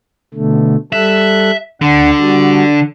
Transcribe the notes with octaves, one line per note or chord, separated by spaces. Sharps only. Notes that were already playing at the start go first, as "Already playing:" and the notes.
B2 D3 A3
G3 A4 E5 F#6
D2 D3 D4 F#5
G3 F#4